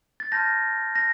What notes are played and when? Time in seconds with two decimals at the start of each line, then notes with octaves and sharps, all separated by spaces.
0.20 A6
0.32 A5 C6 F6 G6 A#6
0.95 A#6